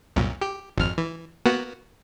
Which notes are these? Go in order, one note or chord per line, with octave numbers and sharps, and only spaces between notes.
C2 F#2 A#2
G4
G#1 F2 F6
E3
A#3 B3 F#4